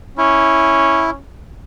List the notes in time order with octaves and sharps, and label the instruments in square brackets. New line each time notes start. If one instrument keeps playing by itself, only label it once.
[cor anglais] C#4 [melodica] E4